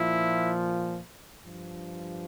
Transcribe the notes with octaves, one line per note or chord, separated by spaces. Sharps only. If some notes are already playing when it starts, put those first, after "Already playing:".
Already playing: A#2 F3 E4
G2 F3